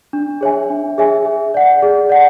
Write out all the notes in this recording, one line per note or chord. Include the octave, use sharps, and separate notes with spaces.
D4
G#4 C#5 E5 G#5
D4
G#4 C#5 E5 G#5
G#4
D5 F#5
G#4
D5 F#5